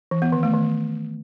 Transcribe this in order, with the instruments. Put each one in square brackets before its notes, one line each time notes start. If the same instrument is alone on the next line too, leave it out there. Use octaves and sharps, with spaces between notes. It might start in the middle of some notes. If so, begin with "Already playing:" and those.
[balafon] E3
B3
D#3
A3
D#3